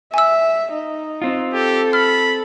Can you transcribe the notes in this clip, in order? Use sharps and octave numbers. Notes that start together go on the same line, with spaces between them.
E5 G#5 E6
D#4
C4 F4
G4 A4
B5 F6